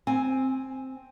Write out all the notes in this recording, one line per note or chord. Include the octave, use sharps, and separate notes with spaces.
C4 G#5